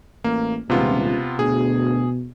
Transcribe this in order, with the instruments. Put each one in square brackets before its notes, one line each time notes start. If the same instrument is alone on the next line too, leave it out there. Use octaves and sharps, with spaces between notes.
[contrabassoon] A1 [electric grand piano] A#3
[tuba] D#1 [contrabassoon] C#2 [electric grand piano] C3 B3 F4
[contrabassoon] D2 [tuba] B2 [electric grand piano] G#4